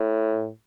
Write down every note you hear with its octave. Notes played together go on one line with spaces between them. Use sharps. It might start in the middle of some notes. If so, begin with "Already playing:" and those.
Already playing: A2